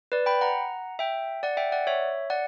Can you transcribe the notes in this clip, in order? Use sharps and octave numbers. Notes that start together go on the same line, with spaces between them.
B4 D5
G5 B5
F#5 A#5
E5 G5
D5 F#5
E5 G5
D5 F#5
C#5 E5
D5 F#5